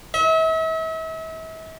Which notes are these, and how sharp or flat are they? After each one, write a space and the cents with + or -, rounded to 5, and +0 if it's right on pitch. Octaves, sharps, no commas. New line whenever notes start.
E5 -40